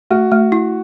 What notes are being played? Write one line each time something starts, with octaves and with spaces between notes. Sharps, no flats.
A3 F#4
A3
E4